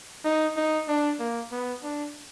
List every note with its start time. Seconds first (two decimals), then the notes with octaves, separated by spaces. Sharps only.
0.25 D#4
0.56 D#4
0.88 D4
1.20 A#3
1.52 B3
1.83 D4